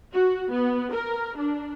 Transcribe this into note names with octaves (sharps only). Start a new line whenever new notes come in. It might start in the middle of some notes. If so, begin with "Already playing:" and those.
F#4
B3
A#4
D4